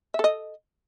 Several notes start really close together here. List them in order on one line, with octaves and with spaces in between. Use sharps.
E5 A4 D#5